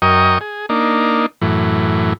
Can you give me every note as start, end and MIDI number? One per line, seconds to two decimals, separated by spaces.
0.02 0.38 42
0.02 0.38 70
0.02 0.38 75
0.02 0.38 79
0.02 0.38 85
0.02 0.38 87
0.41 0.66 68
0.69 1.26 58
0.69 1.26 62
0.69 1.26 63
1.42 2.13 42
1.42 2.13 45
1.42 2.13 52